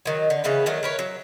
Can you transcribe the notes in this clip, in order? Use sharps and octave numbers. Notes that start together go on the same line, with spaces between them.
D#3 F#3
D3
C#3 E3 B3 B4
D#3 F#3 A3
A#4 B4 C#5
F#3